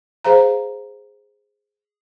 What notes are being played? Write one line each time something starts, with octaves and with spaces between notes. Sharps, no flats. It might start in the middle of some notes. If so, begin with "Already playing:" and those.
G#4 C5 F5 A#5